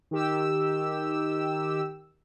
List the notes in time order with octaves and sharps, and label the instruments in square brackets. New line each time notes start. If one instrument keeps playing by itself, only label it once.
[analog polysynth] D#3 G4 E6